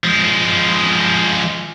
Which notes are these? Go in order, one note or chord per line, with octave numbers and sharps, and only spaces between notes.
F3 G#3